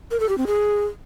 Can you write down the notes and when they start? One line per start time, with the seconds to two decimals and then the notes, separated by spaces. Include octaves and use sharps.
0.11 A#4
0.20 A4
0.29 G4
0.38 C4
0.47 G#4